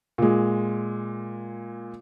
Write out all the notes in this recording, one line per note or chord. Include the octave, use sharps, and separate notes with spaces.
A#2 G#3